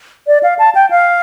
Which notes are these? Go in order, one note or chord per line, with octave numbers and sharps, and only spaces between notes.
D5
F5
A5
G5
F5